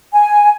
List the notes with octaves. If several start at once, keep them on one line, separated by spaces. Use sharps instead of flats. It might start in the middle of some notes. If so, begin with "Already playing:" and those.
G#5